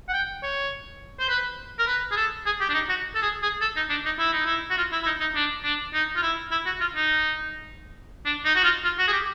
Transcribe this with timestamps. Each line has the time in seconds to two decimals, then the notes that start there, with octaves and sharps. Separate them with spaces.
0.09 F#5
0.14 G5
0.43 C#5
1.20 C5
1.29 B4
1.79 A#4
1.87 B4
2.11 G#4
2.17 A4
2.46 G#4
2.61 G4
2.70 D4
2.74 D#4
2.89 F#4
3.15 A4
3.22 G#4
3.43 G#4
3.61 A4
3.76 D#4
3.90 D4
4.05 D#4
4.19 E4
4.33 D#4
4.46 E4
4.70 F#4
4.78 F4
4.92 E4
5.03 E4
5.06 D#4
5.21 D#4
5.35 D4
5.64 D4
5.94 D#4
6.16 F4
6.23 E4
6.52 E4
6.66 F#4
6.81 F4
6.96 D#4
8.26 D4
8.45 D#4
8.56 F#4
8.64 F4
8.84 F4
8.99 F#4
9.08 G#4
9.13 G4